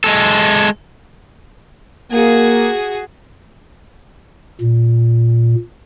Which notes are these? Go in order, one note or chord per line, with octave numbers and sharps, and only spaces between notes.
G#3 A4
A#3 F#4 G#4
A#2